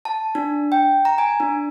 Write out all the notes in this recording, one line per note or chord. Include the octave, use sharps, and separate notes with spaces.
A5
D4
G5
A#5
G#5
D4